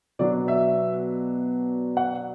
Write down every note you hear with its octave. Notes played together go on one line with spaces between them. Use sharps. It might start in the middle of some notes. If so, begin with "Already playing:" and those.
B2 F#3 B3 D4 D5
E5
F#5